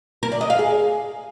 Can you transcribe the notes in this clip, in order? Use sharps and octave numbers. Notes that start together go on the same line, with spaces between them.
A#4
D5
D#5
F5
G#4